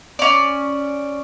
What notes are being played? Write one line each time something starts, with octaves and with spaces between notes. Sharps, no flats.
C#4 D5